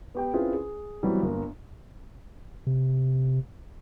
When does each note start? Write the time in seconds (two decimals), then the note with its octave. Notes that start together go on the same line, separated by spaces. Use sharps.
0.15 B3 G4 G5
0.33 C4 C#4 E4 F4 G#4 B4
0.54 G#4
1.03 E3 F#3 G3 B3 C4 F#4
1.22 G1 A#3
2.67 C3